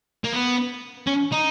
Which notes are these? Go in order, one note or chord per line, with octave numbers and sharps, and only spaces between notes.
A#3
B3
C#4
D#4